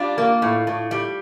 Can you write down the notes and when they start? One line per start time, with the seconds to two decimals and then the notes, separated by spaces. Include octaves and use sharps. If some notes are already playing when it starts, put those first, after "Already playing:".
Already playing: G3 D4 F4
0.18 A#3
0.42 A2
0.67 A2
0.91 G3